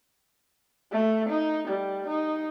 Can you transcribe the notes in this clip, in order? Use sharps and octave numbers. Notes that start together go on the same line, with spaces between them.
A3
D#4
G3
D#4